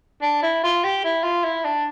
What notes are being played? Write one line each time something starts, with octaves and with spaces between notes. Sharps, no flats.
D4
E4
F4
G4
E4
F4
E4
D4